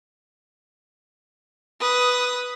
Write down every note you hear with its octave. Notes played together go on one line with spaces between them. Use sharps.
B4 D#6